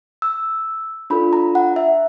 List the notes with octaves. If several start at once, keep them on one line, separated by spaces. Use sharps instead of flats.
E6
D4 F4 A4 B5
A#5
F#5
E5